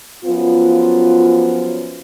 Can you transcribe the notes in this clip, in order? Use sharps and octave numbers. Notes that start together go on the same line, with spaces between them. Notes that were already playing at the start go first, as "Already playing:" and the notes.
F#2 F3 B3 F4